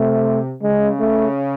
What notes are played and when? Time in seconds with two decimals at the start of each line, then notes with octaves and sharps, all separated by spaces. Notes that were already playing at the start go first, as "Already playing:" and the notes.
Already playing: C3 A3
0.62 C#3 G#3
1.00 A3